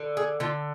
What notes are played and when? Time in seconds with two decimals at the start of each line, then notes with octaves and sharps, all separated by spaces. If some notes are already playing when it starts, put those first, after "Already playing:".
Already playing: D3
0.17 G#4
0.40 D3 F4